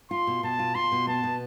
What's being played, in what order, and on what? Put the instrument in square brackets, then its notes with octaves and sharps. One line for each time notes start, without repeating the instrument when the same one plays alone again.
[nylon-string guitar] F4 [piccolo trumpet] C6
[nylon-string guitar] B2
[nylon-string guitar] B2 [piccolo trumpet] A5
[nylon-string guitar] F4
[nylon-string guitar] F4 [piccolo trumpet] C6
[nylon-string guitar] B2
[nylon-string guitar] B3 [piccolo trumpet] A5
[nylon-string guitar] B2